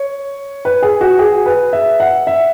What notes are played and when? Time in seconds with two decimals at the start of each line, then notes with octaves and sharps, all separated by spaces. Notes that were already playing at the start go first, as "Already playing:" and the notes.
Already playing: C#5
0.65 B4
0.82 G#4
1.01 F#4
1.19 G#4
1.46 B4
1.73 E5
2.00 F#5
2.27 E5